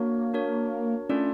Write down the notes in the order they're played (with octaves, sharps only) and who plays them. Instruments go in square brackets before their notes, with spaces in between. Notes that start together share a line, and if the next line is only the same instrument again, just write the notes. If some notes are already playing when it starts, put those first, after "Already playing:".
Already playing: [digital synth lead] A#3 [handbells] D4 F#4 A#4 C#5
[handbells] D4 F#4 A#4 C#5
[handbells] A3 D4 F4 A4 D5 [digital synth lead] C#4